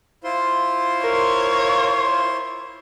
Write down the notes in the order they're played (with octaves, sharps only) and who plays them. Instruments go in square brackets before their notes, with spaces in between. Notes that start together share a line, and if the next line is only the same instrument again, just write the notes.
[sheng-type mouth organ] E4 C5 C6 [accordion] F4
[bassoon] A#4 [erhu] C#5